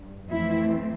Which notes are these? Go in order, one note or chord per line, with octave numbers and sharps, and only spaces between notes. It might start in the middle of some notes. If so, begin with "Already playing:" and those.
Already playing: G2
F2 E3 A3 C4 E4